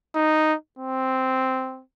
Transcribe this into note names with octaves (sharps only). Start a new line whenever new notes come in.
D#4
C4